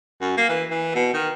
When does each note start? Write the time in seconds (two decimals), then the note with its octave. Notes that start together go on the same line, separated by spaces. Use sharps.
0.21 F#2
0.37 A#3
0.49 E3
0.70 E3
0.95 B2
1.14 D#3